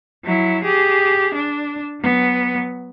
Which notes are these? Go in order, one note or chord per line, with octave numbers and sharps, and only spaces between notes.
F#3 E4
G4 G#4
D4
F#3 B3